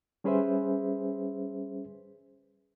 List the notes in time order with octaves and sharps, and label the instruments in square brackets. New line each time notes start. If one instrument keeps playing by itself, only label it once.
[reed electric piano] G3 C#4 G#4 B4 C5 E5